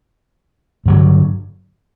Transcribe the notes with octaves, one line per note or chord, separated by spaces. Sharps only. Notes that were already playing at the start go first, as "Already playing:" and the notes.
G2 D3 F#3